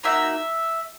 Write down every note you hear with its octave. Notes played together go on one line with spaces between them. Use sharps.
A#3 D#4 F#4 E5